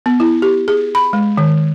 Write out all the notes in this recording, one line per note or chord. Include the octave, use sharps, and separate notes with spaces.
B3
E4
G4
G#4
B5
G#3
D#3